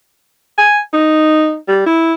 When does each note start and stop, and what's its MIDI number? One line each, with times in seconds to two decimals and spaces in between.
0.58 0.80 80
0.93 1.56 63
1.68 1.82 55
1.86 2.14 64